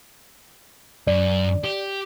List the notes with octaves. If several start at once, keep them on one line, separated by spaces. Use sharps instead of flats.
F#2 D5
G4